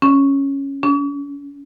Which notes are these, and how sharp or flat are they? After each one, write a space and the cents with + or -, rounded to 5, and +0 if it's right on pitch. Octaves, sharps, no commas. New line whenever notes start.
C#4 -5
C#4 +40